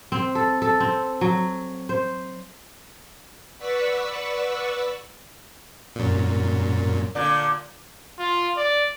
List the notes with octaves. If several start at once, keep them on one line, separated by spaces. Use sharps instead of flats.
C4
A4
A4
C4
F#3
C5
B4 D5 F#5 C#6 E6 B6
F#2 A#2
A#2 D3 D4
F4
D5